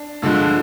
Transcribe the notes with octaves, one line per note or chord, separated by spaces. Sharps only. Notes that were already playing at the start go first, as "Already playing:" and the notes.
Already playing: D4
G2 D3 F3 G#3